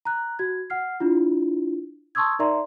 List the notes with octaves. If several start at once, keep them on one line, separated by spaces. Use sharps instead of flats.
A#5 F#6
F#4 G#6
F#5 F6 C7
D4 E4 F4
A5 C6 C#6 D#6 E6 G#6
D#4 A#4 D5 E5 A#5 C6